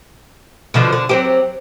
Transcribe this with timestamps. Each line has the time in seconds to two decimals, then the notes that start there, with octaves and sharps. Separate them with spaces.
0.74 B2 D3 F3
0.92 D3
1.09 F#3 C4 G4